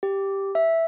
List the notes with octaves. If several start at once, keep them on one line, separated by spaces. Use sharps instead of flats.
G4
E5